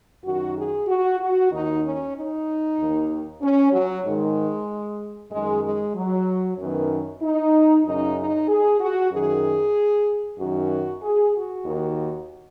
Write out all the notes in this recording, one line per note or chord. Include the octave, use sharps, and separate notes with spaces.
F#2 D#3 F#4
G#4
F#4
F#4
D#2 D#3 D#4
C#4
D#4
D#2 D#3
C#4
F#3
G#2 D#3 G#3
F#2 D#3 G#3
G#3
F#3
F#2 D#3 B3
D#4
F#2 C#3 D#4
D#4
G#4
F#4
F#2 D#3 G#4
F#2 D#3 F#4
G#4
F#4
D#2 D#3